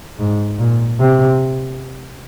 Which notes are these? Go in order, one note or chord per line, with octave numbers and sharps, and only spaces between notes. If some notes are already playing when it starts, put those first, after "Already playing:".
G#2
A#2
C3